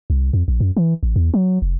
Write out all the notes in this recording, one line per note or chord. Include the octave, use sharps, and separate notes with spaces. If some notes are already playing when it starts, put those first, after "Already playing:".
C2
F2
A#1
F#2
E3
A1
E2
F#3
F1